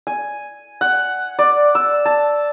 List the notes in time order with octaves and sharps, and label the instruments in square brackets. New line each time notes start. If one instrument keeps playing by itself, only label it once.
[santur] G#5
F#5
D5
E6
A5